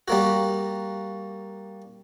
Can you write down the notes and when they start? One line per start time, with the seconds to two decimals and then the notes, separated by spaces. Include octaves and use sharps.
0.08 G3 A#3 F#4